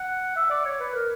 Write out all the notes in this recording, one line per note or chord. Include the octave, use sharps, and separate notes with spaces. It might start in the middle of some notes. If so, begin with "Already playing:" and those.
Already playing: F#5
E5
D5
C#5
B4
A#4